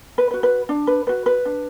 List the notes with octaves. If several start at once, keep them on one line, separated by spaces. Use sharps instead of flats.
B4
F#4 B4
B4
D4
B4
F#4 B4
B4
D4